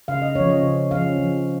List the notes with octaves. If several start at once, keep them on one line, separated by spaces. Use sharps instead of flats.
C#3 F5
D#5
F3 C#4 C#5
D#5
C#3
F3 C#4 F5
F3